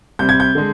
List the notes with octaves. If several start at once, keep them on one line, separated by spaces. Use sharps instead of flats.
C3 G3 C4 G6
G#6
G6
D3 G#3